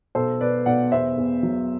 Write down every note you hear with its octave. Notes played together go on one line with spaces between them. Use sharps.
B1 A4 C5
B2 B4 D5
B1 D5 F#5
E2 C5 E5
E2
F#3